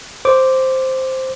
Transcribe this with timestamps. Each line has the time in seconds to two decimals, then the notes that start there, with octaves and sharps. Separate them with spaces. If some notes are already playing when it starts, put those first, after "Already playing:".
0.25 C5 D6